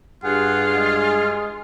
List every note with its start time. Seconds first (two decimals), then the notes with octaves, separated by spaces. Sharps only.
0.24 G2 F4 G#4 F#5
0.76 G#3